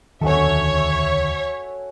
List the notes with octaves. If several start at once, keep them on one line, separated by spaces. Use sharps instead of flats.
E1 D2 D#3 C#4 F#4 A4 C#5 E5